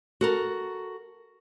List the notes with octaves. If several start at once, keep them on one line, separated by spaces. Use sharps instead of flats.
F#4 A4 A#4